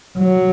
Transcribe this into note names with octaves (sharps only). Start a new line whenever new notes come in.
F#3